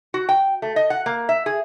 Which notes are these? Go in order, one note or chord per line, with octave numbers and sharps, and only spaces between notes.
F#4
G5
A3
D#5
F#5
A#3
E5
G#4